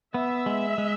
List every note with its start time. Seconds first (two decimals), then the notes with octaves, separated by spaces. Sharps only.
0.14 B3 E5
0.46 G#3
0.78 G#3